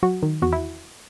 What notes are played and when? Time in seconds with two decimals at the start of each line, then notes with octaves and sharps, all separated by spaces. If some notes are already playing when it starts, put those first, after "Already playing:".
0.03 F#3 F#4
0.23 D#3
0.42 E2 F#4
0.53 E4